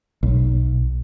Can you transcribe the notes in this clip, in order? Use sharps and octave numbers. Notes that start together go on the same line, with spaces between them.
B1